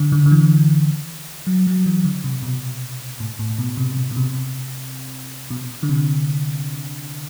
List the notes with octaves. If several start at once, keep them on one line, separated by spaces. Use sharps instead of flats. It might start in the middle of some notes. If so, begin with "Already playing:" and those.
Already playing: D3
D3
D3
E3
F#3
F#3
E3
D3
C3
B2
A2
A2
B2
C3
B2
B2
C3
B2
D3
C3